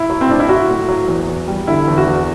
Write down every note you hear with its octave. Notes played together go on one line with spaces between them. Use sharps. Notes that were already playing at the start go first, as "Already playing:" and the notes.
Already playing: E4
F#3
C4
A2 D4
E4
F#3 F#4
A2
F#3
E2
E2
G3
D3 E4
E2
F#4
E2